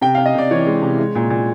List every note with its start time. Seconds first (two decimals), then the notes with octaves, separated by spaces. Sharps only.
0.01 C3 G5
0.15 C3 F5
0.26 D#5
0.35 C3 D5
0.51 E3 C#5
0.66 G#3
0.82 C3
0.99 G#3
1.15 A#2
1.30 A#2